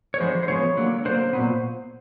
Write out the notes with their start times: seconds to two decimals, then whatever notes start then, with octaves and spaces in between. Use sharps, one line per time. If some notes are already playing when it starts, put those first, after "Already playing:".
0.14 C#5
0.20 D3 F3 G#3 B3 C5
0.43 C5
0.48 D3 F3 G#3 B3 C#5
0.77 D3 F#3 A#3
1.05 D3 F#3 A#3 C5
1.33 A#2 F#3 B3